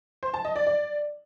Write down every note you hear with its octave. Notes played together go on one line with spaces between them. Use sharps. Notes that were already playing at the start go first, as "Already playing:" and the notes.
C5
A5
D#5
D5
D5